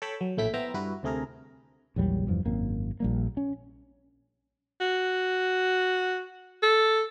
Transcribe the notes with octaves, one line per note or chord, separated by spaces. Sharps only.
A4 C#5 G5 A5 B5
F#3
A#1 A2 A3 E4 G5 B6
B3 E4 C5 E5 G5 A#5
G2 E4 F#4 B4
D2 C3 A3 G#4 A#4 A#5
A#1 E2 F#3 G3
F1 E2 G2 F3
G#1 F#2 A#3 C4
A#1 G3 A#3
C#4
F#4
A4